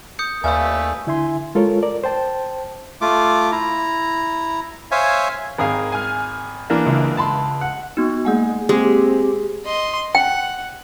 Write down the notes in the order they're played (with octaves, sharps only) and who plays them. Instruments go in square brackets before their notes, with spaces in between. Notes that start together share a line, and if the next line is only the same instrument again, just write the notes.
[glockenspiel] D#6 G6 C#7
[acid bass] D#2 [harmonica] A3 B4 [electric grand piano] D5 E5 F5 [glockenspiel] G#5 D#6
[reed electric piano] D3 E4 E5 G#5 C6
G#3 F4 A4 A#4 C#5
A#4 D5
C5 G5 A5
[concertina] A3 F4 D6
E4 A#5
C5 C#5 E5 F5 G#5
[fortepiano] G#1 G#4 F5 [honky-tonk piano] A#4
[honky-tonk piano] G#5 F6
[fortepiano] E3 A#3 D4
[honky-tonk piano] C#2 E5
[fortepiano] A5 B5 C6
F#5
[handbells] B3 D#4 [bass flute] F#4
[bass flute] G#3 [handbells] A#3 F#5 G#5
[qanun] G#3 [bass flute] C4 [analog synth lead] G4
[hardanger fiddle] D#5 C6
[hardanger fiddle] F#5 [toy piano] G5